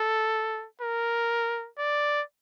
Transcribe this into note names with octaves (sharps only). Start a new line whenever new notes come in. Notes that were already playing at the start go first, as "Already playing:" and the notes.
Already playing: A4
A#4
D5